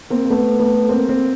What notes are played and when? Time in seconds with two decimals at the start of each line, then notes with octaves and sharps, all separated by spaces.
0.10 A#3 C4
0.25 A#3
0.30 A3 B3
0.59 A3 B3
0.89 A#3 C4
1.09 A#3 C4